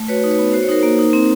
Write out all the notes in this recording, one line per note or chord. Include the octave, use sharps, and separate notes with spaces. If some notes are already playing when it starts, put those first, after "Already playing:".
Already playing: A3
F#4 B4 C#5
D#4
B4 C#5
B3
F#4 C5
C#5
D#4 A#4 C5
A#3
D#4
C4